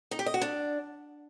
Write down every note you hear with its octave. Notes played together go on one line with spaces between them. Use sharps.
D#4
G4
D#5
F#4
D4